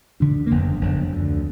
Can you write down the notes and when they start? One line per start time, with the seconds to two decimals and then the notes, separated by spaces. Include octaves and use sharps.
0.20 D2 D3 D4
0.46 A#3
0.51 F#1 F2 D3 B3
0.81 F#1 F2 D3
1.12 D2 D3